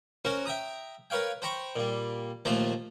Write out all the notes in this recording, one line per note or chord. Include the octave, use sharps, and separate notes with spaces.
C#4 F#4 A#4 C5
E5 G5 A#5 D#6
A#4 B4 C#5 F5 G5
C5 G5 A#5 B5 C#6
A#2 G3
D#2 A#2 F3 A3 C5 A#5